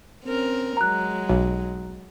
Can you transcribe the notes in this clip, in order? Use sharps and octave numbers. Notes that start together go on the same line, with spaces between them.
C4 C#4 A#4
F#3 G#3 A#5 F#6
B1